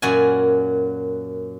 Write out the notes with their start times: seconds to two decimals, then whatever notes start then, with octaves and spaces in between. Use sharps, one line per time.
0.02 F#2 A#2 F#4 G#5